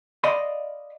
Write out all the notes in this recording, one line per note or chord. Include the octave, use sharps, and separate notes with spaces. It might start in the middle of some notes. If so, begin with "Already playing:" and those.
D5 D#5 F5 B5 C6